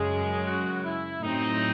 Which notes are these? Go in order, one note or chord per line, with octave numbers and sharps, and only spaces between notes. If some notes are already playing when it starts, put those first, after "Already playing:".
Already playing: F#2 C#3 G#3 G#4
F#4
E4
A2 F#3 C4 D#4